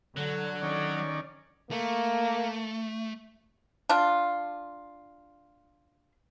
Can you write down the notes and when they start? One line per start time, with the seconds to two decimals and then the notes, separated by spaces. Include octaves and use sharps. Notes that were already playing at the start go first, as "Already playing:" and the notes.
0.16 D3 F#3
0.63 D#3 C#4 D5
1.71 A3 A#3
3.89 D4 F4